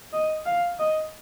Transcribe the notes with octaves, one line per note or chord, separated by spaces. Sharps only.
D#5
F5
D#5